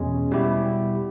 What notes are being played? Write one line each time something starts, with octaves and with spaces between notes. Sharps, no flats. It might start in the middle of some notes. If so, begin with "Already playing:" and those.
Already playing: E2 B2 G#3 C#4
B2 G3 B3 E4 G4